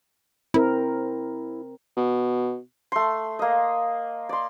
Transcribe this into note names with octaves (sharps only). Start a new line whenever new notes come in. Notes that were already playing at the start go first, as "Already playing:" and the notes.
C4 E4 A#4
B2
A3 C6
A#3 D#5
D5 C6